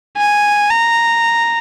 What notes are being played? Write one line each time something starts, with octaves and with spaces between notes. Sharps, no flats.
G#5
A#5